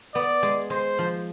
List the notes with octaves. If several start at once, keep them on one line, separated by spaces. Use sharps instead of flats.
B3 D5
G#3
G#3 C5
F3